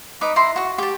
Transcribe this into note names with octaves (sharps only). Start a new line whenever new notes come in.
D#4 B4 D6
E4 A#5 C6
F#4 C#6
G4 A5